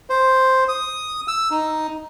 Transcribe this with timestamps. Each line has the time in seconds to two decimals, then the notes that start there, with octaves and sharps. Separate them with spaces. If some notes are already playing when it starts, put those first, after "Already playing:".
0.10 C5
0.68 D#6
1.28 E6
1.51 D#4